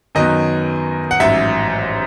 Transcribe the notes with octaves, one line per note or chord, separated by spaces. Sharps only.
F#2 D#3 F#3 B3 D#5
F#5
A1 G#2 F#3 E5